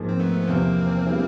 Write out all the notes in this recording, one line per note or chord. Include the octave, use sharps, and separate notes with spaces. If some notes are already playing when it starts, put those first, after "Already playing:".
Already playing: G#2 F3 A#3
C4
A3 B3
B3
E2 C3 F3 A#3 C4
E3 G3 B3 E4 G#4